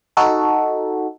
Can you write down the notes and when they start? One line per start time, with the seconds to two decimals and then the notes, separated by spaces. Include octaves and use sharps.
0.17 D#4 F#4 A4